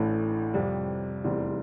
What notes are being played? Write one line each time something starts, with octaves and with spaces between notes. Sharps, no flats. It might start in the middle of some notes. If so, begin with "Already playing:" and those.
Already playing: A1 A2 E3 A3 D4
F2 C3 G3
F1 E2 E3 G3 C4